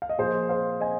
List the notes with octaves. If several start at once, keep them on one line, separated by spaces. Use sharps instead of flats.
F5
D#5
A#2 F3 G#4 C5
C5 F5
D#5 G#5